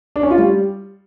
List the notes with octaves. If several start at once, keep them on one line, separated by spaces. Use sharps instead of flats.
D4
C#4
F4
G3